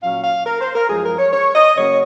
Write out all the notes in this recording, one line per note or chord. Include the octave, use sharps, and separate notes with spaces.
A#2 F#3 C#4 F5
F5
A#4
C5
A#4
F#2 F3 G#3 G#4
A#4
C#5
C#5
D#5
C#3 F#3 A#3 C#4 C#5